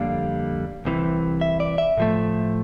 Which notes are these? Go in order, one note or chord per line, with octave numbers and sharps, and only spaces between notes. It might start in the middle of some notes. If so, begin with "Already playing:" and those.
Already playing: F2 D3 G3 A#3 F5
C2 C3 E3
E5
D5
E5
A2 F3 A3